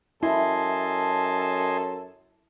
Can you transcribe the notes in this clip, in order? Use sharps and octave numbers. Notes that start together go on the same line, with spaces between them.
F#2 E4 A4 D#5 G#5 A5 C6